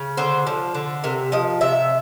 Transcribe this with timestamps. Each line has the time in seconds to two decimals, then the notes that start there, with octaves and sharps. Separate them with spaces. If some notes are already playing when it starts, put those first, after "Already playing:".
Already playing: C#3
0.17 D3 C5
0.47 F3
0.75 D3
1.04 C3 A#4
1.32 F3 D#5
1.61 C3 E5